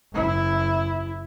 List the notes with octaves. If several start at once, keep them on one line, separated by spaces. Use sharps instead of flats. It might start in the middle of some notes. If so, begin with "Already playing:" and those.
F#1 E4